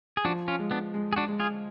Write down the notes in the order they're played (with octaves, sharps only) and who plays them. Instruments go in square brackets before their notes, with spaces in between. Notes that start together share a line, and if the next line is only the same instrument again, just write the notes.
[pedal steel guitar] G#4
[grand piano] F3 [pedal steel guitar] D4 F#4
[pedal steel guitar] C#4 F4
[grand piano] G#3
[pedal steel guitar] B3 D4
[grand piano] G#3
[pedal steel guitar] G#4
D4 F#4
[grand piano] G#3
[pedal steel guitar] F4 G#4